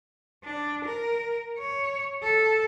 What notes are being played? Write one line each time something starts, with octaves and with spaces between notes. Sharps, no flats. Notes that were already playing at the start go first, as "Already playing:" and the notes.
D4
A#4
C#5
A4